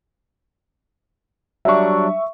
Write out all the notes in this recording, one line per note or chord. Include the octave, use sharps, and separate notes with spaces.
F#3 G3 D4 E5 C#6